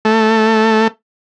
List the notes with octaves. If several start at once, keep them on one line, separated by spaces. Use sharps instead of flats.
A3